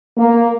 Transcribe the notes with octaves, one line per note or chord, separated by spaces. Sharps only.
A#3